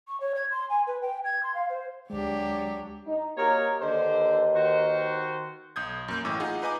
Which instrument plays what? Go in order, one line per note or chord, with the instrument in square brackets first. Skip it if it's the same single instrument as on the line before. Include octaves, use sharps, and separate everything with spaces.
[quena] C#6
C#5
G#6
C6
G#5
B4
G5
G#6
C6
F5
C5
[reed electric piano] D2 G#3 [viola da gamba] F#3 D4 G4
[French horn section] D#4
[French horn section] A#3 F#4 G4 [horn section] A#4 C#5 D#5
[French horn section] D#2 B4 D#5 [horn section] D3 C5
[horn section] D#3 F#4 C5
[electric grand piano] B1 D#6 G6 G#6
F#2 A#3 G6
A1 A2 D6 E6
D#4 F4 G#4 F#5
D#4 B4 D#5 G#5 D6